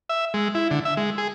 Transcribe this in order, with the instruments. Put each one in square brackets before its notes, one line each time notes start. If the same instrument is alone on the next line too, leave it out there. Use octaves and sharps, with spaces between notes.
[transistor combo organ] E5
G#3
E4
D3
E5
G#3
G#4